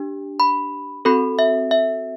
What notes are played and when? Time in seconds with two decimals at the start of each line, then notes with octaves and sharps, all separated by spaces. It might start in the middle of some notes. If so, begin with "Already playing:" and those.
Already playing: D4 G4
0.40 B5
1.05 C4 F#4 A4 B5
1.39 E5
1.71 E5